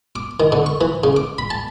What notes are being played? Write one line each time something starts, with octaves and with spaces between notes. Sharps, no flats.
D6
D#3
D3
C#6
E3
C#3
D6
B5
A5